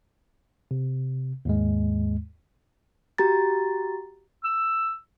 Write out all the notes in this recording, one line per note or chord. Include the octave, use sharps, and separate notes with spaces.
C3
D#2 G#2 G#3
F#4 G4 A#5 A6
E6